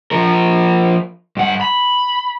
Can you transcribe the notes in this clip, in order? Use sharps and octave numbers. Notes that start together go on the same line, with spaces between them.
F3 A#4
G2 F#5
B5